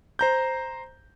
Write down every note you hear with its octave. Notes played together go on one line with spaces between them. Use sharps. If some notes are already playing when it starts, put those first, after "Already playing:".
C5 A#5 G6